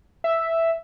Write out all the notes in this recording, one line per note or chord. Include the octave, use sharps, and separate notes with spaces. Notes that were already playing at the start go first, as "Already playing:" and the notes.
E5